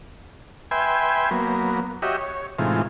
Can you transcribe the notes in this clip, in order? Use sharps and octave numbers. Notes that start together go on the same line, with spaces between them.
B4 E5 G5 G#5 C6
F#3 A#3 B3
F#4 G4 C#5 D#5 E5
C#5
A2 C3 E3 G#3 D#4 F4